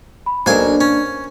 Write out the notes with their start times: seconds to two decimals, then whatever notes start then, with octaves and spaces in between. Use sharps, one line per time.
0.26 B5
0.46 B1 A#3 D4 A#4 C5 G#5
0.81 C#4